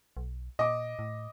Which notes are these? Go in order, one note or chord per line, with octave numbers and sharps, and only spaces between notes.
B1
A#2 D#5 D6
A2